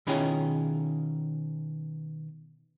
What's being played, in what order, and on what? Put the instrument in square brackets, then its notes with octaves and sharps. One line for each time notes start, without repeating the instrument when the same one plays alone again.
[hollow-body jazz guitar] B2 D#3 C#4 E4 F4 G#4